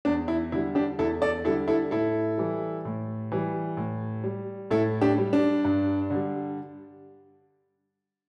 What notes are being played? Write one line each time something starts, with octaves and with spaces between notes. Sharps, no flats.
E2 D4
E4
D3 G3 E4
D4 G4
E2 E4 A4
A4 D5
D3 G3 E4 A4
E4 A4
A2 E4 A4
E3 G3
A2
E3 G3
A2
G3
A2 E4 A4
D4 G4
G3
D4
G2
D3 G3